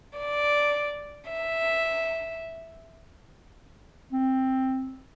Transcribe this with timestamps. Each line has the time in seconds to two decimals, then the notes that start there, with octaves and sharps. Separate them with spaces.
0.17 D5
1.30 E5
4.13 C4